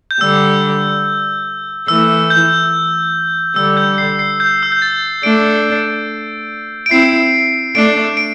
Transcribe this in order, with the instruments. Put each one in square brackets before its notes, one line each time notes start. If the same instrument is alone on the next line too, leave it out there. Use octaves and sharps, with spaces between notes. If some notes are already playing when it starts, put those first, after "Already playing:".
[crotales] G6
[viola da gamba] D3 G3 [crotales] E6
[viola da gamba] E3 A3 [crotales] E6
[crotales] G6
[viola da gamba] D3 G3 [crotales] E6
[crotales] G6
C7
C7
G6
E6
G6
A6
[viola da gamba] A3 D4 [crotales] D7
[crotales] D7
[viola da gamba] C4 E4 [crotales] C7
[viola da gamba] A3 D4 [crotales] D7
[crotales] D7